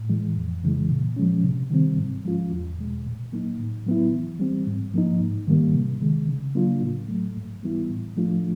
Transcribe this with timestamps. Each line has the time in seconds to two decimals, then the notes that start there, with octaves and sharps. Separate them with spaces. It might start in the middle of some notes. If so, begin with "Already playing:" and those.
Already playing: A2
0.09 E3 G#3
0.37 F2
0.64 C#3 E3 G#3
0.90 A#2
1.16 F3 G#3 C#4
1.44 C3
1.70 D#3 G3 C4
1.97 G#2
2.25 F3 G#3 C#4 F4
2.52 E2
2.78 B2 G#3
3.05 A#2
3.32 F#3 A#3 D#4
3.59 A2
3.86 F#3 B3 E4
4.12 E3
4.40 G3 C4
4.67 G#2
4.94 F3 A#3 D#4
5.20 G#2
5.47 D#3 G3 A#3
5.74 C3
6.01 D#3 G#3
6.28 C#3
6.55 F#3 A#3 D4 F4
6.81 A2
7.08 F#3 A3
7.36 G#2
7.63 E3 G3 B3 E4
7.90 A2
8.17 F3 A3 D4 F4